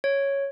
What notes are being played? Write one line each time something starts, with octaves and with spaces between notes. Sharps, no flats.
C#5